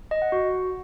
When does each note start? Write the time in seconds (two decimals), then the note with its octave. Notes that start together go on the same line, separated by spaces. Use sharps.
0.11 D#5
0.22 F#5
0.32 F#4